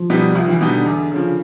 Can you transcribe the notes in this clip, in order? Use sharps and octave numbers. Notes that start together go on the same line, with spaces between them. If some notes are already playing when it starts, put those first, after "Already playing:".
Already playing: F3
B2 G3 B3 D#4
C2 F3
D#3
E3
B2 G3 B3 D#4
D3
E2
C#3 F3